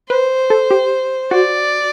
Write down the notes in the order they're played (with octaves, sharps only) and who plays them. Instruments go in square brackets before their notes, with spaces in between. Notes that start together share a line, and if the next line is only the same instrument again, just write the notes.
[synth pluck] B4 [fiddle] C5
[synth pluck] A4
G4
[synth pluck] F#4 [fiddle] D5